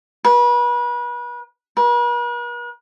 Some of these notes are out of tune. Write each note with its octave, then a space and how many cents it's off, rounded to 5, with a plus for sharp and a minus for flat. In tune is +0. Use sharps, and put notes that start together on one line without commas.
B4 -35
B4 -45